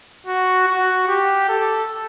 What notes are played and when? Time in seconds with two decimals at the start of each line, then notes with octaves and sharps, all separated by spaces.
0.27 F#4
0.68 F#4
1.08 G4
1.49 A4